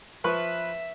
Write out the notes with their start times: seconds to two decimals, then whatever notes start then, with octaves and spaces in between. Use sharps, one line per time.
0.24 F3 B4 E5 C#6